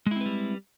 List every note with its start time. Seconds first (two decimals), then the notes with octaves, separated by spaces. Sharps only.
0.06 G#3
0.11 E4
0.16 C4
0.21 B4
0.26 G3